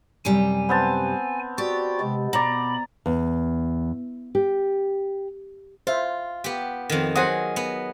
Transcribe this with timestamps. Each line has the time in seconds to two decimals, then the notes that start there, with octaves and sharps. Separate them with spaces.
0.25 F#2 C3 G3 G#5
0.69 B3 C4 A5
1.58 F#4 G4 D5
2.01 C3 G#3
2.33 B2 D5 A#5 B5
3.06 E2
4.35 G4
5.87 F4 C5 E5
6.44 B3 G4
6.89 F2 D#3
7.16 F#3 G#4 C5 F#5 D#6
7.56 B3